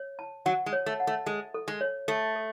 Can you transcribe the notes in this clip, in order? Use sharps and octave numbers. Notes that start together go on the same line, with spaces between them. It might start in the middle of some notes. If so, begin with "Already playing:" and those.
Already playing: C#5
A5
F#3 F#5
G#3
C#5
A3
F#5
A3
G#3 A4
A4
G#3
C#5
A3 A4
A4